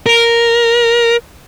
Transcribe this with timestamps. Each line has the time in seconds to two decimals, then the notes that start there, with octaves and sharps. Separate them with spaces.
0.06 A#4